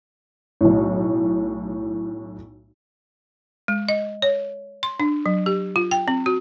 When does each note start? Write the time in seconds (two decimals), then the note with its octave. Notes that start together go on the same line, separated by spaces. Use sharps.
0.61 B1 A2
3.68 G#3
3.89 D#5
4.22 C#5
4.83 C6
5.00 D4
5.26 F#3
5.46 G4
5.76 F4
5.91 G5
6.08 C4
6.26 F#4